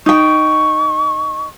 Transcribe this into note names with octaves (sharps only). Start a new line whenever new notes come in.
D#4 G5 C#6